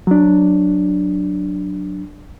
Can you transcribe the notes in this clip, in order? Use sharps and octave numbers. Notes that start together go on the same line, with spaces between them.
F#3 D4